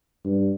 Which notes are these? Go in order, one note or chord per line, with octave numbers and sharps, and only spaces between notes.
G2